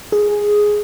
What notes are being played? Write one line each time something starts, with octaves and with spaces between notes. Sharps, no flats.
G#4